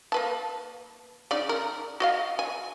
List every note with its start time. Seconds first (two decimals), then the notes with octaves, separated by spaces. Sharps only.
0.12 A#3 B4 A5
1.31 C#3 D#4 D5
1.49 A#4
2.00 F#4 D#5 F5
2.39 G#5